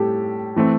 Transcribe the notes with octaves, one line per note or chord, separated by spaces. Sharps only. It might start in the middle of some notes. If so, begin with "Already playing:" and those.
Already playing: A2 G3 C4 G4 A4
E3 A3 C4